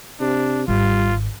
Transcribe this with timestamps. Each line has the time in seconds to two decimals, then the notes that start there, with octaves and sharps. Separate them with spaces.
0.20 C3 D4
0.68 G#1 G3 F4